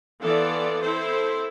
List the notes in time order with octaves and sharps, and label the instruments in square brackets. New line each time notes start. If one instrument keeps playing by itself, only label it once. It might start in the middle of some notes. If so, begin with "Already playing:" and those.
[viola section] E3 B3 F4 A4 D5
C4 E4 A4 C5